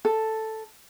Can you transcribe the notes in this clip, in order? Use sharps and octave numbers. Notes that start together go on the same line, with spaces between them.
A4